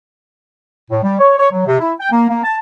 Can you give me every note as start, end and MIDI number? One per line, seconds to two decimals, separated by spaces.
0.91 1.00 45
1.03 1.18 55
1.19 1.39 73
1.39 1.48 73
1.52 1.66 54
1.66 1.78 48
1.79 1.92 64
2.00 2.08 79
2.11 2.27 58
2.29 2.42 58
2.44 2.57 81